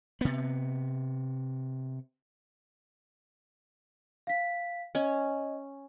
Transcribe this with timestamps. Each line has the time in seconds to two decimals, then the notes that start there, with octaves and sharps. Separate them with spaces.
0.21 C3 B3
4.27 F5 B6
4.95 C#4 D#5